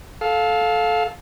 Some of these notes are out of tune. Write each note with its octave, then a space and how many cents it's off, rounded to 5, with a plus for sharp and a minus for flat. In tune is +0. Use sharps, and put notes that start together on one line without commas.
A4 -15 F5 +15